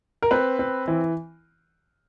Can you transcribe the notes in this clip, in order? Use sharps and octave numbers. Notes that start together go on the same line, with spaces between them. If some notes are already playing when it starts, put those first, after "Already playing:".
A#4
C4 B4
C4
E3